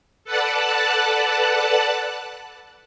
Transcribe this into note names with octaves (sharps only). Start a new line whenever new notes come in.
A4 B4 D5 F#5 A5 F#6